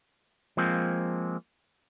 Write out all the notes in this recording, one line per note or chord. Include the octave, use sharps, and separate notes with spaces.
F3 G#3 A#3 C4